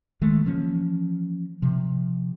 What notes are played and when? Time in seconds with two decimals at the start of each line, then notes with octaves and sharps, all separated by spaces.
0.21 D#3 G#3 A3
0.45 E3 F3 A#3 C#4
1.62 C3 F3